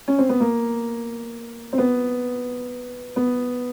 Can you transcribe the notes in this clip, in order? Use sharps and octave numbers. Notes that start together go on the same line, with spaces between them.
C#4
C4
B3
A#3
C4
B3
B3